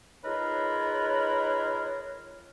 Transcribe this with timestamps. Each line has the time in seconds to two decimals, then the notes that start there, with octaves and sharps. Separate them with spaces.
0.24 D#4 F4 G#4 A#4 B4 C#5